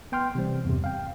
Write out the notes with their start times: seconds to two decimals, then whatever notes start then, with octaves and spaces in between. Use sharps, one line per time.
0.12 B3 G5 C6 F6
0.35 C3 E3 G3 C4
0.65 E2 G2 C3
0.84 F5 G5